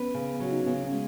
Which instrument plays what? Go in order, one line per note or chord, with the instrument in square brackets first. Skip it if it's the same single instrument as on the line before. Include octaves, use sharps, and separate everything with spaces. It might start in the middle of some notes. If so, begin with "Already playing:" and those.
Already playing: [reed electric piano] B3 C#4 [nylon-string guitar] B4
[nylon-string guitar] C#3
[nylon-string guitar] F#3 [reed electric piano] F#4
[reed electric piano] D#4
C#4
[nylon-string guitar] C#3 [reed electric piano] B3
[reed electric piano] C#4
[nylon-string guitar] G#3